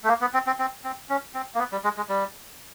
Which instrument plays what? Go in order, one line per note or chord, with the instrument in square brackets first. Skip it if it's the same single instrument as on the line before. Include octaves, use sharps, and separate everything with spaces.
[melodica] A3
A#3
B3
C4
C4
C4
C4
C#4
C4
A#3
B3
G3
G#3
G#3
G3